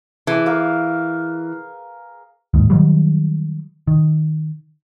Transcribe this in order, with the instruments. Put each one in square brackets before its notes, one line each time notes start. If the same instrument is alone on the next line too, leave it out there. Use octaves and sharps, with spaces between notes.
[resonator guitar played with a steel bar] E3 [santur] G#4 D6
[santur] A#4 F5 C#6
[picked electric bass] D1 D#2 G#2
D#3 F#3 G3
D#3